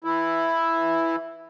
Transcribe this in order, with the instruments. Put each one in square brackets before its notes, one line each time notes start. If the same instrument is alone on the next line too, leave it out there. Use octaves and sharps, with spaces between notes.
[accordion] E3 E4